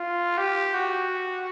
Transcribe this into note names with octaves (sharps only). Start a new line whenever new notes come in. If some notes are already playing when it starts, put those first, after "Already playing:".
Already playing: F4
G4
F#4